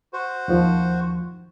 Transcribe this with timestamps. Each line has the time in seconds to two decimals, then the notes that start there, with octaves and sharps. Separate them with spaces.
0.13 F#4 C5
0.48 D#2 D#3 F3